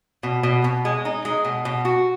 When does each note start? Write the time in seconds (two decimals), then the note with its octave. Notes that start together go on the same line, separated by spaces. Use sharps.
0.23 B2
0.43 B2
0.64 B2
0.85 G#3
1.05 D#4
1.25 G#3
1.45 B2
1.65 B2
1.85 F#4